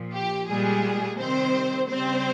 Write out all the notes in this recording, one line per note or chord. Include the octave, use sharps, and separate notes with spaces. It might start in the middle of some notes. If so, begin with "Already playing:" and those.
Already playing: A#2 F3
G4
A#2 G3 G#3 G#4
C3 D#3 G3 C4 C5
C#3 G3 C4 C5